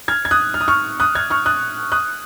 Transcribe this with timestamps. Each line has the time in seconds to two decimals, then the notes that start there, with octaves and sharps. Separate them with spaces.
0.08 F6 G#6
0.25 G#6
0.31 D#6 F#6
0.54 F6
0.61 D#6
0.68 C#6 F6
1.00 D#6 F#6
1.15 F6 G#6
1.30 C#6 F6
1.46 D#6 F#6
1.92 D#6 F#6